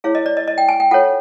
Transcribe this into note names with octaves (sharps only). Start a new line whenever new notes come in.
E4 G#4 C#5 F5
D#5
D5
D#5
D#5
G5
G#5
G5
F4 A4 C#5 F#5